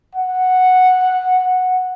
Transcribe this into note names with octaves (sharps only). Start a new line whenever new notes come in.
F#5